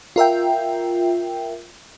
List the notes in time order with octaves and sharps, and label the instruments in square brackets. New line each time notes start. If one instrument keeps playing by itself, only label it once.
[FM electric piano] F4 A#4 E5 G5